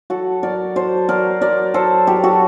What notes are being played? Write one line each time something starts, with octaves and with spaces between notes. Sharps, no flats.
F#3 F#4 A4
F#3 A#4 D5
F#3 A4 C5
F#3 A#4 D5
F#3 A#4 D5
F#3 A4 C5
F#3 G4 A#4
F#4 A4